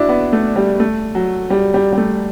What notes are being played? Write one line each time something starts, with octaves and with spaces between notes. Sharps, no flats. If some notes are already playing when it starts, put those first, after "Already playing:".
Already playing: D4 E4 F#4
B3
A3
G3
A3
F#3
G3
G3
G3
A3